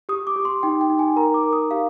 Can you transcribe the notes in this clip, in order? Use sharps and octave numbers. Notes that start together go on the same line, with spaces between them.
G4 D#6
D6
G4
C6
D#4 G5
G5
D#4
G#5
A#4 A#5
D6
A#4
D#6
G4 F5